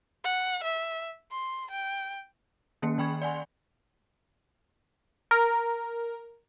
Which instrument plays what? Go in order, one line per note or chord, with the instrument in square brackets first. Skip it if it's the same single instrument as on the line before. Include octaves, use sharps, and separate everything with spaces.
[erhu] F#5
E5
C6
G5
[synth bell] D#3 A#3 C#4 C#7
D#3 G5 B5 C#6 G#6
D5 F#5 G#5 C6
[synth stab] A#4